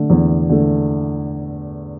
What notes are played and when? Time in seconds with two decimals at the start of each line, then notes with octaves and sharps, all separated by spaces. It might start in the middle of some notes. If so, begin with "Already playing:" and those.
Already playing: D3 A3
0.10 E2
0.49 D3 A3